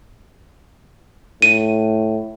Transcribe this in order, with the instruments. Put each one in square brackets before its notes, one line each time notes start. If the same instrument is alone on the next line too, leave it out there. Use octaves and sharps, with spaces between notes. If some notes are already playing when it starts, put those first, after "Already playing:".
[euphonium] A2 [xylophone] D#7